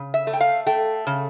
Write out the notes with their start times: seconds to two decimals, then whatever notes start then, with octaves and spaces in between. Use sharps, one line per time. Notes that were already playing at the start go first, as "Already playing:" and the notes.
Already playing: C#3
0.14 E5
0.27 A3
0.33 G5
0.41 F5
0.67 A3 G5
1.07 C#3